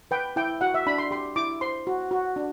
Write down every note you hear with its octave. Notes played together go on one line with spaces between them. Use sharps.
B4 G5
E4 G5
F#4 F#5
E5
D4 B5
C6
G4 C6
E4 D6
C5 C6
F#4
F#4
D4